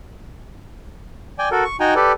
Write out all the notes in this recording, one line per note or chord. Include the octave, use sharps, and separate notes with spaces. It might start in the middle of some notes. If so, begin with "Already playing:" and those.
D5 G5 G#5
F#4 A4 A#4
C#6
D#4 F#4 G5 G#5 A#5
G4 A4 B4 D5